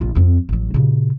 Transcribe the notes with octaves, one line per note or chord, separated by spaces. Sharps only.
A#1 F4
F2 C4
A1 F#3
A#2 C#3